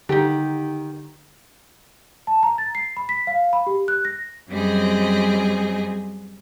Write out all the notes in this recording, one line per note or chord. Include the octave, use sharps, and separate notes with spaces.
D3 D#3 D#4 G4
A5
A#5
A6
C7
B5
B6
F5
B5
G4
F#6
A#6
F#2 G3 C4 G#4 D#5